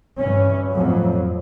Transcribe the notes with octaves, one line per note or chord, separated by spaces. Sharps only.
G2 E3 C#4
F2 A2 F#3